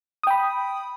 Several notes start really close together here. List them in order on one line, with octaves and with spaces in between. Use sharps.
D#6 G5 B5